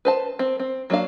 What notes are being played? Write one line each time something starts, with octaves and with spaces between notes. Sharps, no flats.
B4 C5 A5
C4
C4
F#3 A#3 D4 F5